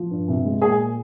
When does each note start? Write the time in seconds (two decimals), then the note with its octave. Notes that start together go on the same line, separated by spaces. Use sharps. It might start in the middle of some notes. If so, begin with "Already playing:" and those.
Already playing: F3
0.11 G2
0.28 C2
0.45 G#3
0.62 A#2 G#4